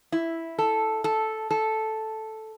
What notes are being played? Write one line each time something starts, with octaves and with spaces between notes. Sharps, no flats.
E4
A4
A4
A4